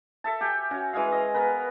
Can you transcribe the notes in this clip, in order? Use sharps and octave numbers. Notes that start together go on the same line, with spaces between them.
A4 E5 A5
G4 G5 G#5
C#4 F#4
E3 G#3 G#4 F5
D#5
B3 A#4 B4